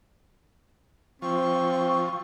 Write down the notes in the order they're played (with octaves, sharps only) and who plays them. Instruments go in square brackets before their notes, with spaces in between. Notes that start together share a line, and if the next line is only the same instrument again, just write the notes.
[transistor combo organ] F3 [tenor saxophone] C4 [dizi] C#6